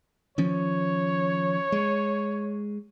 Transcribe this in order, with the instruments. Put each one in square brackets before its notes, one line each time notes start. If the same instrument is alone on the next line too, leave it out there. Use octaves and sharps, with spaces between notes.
[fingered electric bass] D#3 F3 C#4 [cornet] C#5
[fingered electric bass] G#3